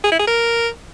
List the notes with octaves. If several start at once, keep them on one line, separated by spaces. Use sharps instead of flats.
G#4
E4
G#4
A#4